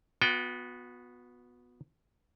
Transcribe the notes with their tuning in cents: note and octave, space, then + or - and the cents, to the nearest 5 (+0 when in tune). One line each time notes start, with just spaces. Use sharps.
B3 +0 F#4 -35 G5 +0